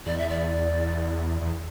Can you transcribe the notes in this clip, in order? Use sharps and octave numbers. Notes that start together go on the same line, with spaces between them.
E2 D5
E5
D5
E2